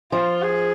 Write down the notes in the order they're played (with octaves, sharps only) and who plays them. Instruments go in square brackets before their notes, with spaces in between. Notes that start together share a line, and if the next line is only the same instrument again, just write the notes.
[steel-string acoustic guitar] F3 [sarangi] F4
[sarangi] G#4